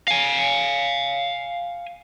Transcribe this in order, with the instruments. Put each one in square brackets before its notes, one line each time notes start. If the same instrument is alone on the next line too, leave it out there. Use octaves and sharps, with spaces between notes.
[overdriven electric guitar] F5 G#5